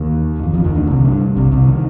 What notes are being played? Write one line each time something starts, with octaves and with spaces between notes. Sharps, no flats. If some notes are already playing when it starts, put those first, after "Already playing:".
Already playing: D#2 D#3
F2 F3
F2 F3
D#2 D#3
D2 D3
C2 C3
G2
C2 C3
C2 C3
D#3